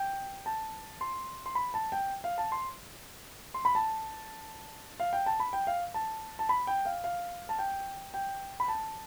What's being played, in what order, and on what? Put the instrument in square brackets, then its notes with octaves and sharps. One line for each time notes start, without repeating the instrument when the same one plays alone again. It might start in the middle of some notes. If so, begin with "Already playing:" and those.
Already playing: [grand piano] G5
A5
C6
C6
B5
A5
G5
F5
A5
C6
C6
B5
A5
F5
G5
A5
B5
G5
F5
A5
A5
B5
G5
F5
F5
A5
G5
G5
B5
A5